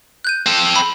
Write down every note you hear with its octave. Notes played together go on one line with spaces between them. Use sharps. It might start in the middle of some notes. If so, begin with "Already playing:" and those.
F#6 G6 D#7
C4 A4
B5